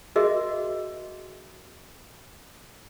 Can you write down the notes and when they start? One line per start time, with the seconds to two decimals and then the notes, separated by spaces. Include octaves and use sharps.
0.16 F#4 G#4 A#4 D#5 E5